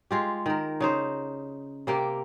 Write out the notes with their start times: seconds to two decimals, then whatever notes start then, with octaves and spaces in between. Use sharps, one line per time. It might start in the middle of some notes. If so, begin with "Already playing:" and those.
0.11 G#3 F4 G4
0.46 D#3 A#4
0.80 C#3 D#4 C5
1.87 C3 A#3 G4 G5